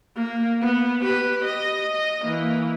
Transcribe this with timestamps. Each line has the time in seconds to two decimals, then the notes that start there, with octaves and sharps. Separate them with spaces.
0.16 A#3
0.62 B3
1.03 G4 B4
1.45 D#5
1.94 D#5
2.25 E3 A#3